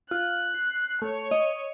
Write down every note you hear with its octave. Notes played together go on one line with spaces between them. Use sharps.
F4 F#6
C7
A3 C#5
D#5